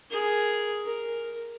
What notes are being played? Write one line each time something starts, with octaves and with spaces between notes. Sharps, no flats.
G#4 A#4
A#4